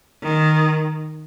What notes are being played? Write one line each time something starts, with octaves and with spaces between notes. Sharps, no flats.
D#3